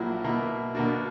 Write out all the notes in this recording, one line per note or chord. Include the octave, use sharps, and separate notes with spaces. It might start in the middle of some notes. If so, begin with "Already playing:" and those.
Already playing: A#1 A#2 F#3 A#3 E4
B2 A#3 E4
B2 A#3 D4 F#4